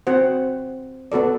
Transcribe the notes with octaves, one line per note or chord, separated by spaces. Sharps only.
C4 F#4 C5 F#5
B3 F#4 A4 D5